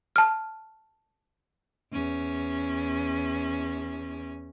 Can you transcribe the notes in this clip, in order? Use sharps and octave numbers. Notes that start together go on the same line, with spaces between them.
A5 F6
E2 C#4